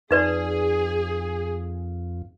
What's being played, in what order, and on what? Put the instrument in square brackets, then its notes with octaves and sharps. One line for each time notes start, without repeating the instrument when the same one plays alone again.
[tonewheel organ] F2 [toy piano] D#4 B4 D5 [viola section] G#4